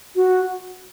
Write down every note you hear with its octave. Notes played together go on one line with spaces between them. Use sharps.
F#4